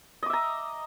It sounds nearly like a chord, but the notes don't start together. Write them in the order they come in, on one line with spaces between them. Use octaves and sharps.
D#5 D6 E5 A#5